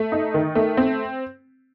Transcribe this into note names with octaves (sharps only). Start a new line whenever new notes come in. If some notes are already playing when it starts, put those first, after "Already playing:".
Already playing: A3
D#4
D#3
A3
C4